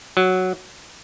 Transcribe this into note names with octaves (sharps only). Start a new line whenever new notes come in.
F#3